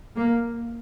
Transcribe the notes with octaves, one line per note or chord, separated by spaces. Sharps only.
A#3